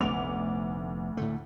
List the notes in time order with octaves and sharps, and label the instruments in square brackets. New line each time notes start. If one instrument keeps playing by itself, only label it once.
[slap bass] F1 B3 [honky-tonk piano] D2 D6 F7
[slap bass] A2 D3 A3